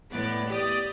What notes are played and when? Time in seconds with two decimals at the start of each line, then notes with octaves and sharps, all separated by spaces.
0.11 A2 B3 D5
0.48 G4 D5 D#6